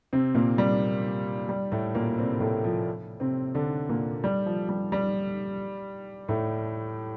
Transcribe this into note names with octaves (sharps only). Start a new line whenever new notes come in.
C3 C4
A#2 A#3
G3
G3
A2 A3
A#2 A#3
C3 C4
A2 A3
F3
C3 C4
D3 D4
A#2 A#3
G3
F3
G3
G3
A2 A3